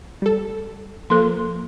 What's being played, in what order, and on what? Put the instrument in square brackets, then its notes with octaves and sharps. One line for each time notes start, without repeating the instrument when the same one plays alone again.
[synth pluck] G3 A4
[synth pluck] F3 A#3 [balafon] A4 C6